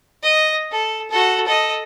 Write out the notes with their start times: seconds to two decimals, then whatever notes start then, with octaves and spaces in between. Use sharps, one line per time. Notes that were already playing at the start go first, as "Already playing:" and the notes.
0.22 D#5
0.71 A4
1.10 F#4 A4
1.46 A4 D#5